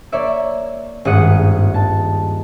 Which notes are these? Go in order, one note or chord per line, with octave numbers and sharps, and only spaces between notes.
A#3 C#5 D5 E5
D#1 G#1 G2 F#5 D#6 C#7
A5